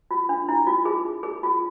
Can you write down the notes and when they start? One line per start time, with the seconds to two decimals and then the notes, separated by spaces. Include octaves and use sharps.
0.11 F4
0.29 D4
0.48 E4
0.67 F4
0.85 G#4
1.23 G#4
1.43 F4